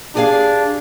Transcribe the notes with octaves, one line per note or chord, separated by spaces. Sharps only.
D4 G4 G#4 F5